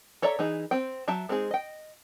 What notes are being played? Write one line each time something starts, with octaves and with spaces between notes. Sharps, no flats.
A4 C#5 D5 E5 A#5
E3 D#4 G#4
C4 G5
F#3 E5 G5 A5
G#3 C4 D#4 G#4
D#5 G5